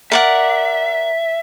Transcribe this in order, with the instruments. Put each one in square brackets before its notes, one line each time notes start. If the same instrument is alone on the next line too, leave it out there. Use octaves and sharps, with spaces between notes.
[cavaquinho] A#4 D5 F#5 [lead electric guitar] E5